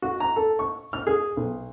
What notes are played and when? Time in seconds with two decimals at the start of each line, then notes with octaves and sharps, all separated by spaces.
0.02 F#4
0.20 A#5
0.36 A4
0.59 C#6
0.93 F6
1.07 G#4
1.37 B1